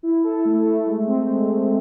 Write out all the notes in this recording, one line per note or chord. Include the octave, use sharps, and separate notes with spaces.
E4
A4
A3
A3
G#3
C4
G#3
G#3